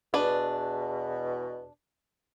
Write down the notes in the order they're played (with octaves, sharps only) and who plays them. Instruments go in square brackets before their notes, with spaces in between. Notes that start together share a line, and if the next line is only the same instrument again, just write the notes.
[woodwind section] E2 B2 [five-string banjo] D4 B4